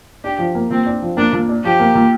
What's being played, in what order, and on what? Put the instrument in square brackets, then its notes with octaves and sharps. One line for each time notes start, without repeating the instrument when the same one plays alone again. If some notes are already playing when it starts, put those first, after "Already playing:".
[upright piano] D4 [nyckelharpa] G4
[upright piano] F3
A#3
[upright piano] A#2 [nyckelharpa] C4
[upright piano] D4
F3
[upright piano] A#3 [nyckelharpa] D4
[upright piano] A#2
D4
[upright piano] F3 [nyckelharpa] G4
[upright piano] A#3
A#2